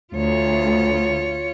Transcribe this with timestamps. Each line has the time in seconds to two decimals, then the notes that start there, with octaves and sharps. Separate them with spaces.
0.14 D2 F4 C#5